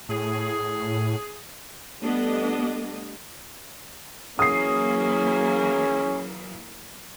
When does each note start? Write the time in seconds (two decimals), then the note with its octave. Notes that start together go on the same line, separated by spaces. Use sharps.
0.09 A2 G#4
2.01 G3 A3 B3 D4 D#5
4.39 E3 F#3 A#3 C#4 G#4 D#6 C7